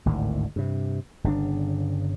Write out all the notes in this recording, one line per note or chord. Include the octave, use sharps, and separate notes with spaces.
G#1 D2 A2 D#3
G2 C3
G1 C#3 C#4 D4